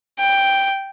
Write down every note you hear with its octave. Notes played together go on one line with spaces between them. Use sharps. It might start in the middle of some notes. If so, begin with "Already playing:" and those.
G5